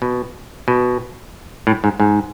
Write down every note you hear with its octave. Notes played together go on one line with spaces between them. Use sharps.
B2
B2
A2
G#2
G#2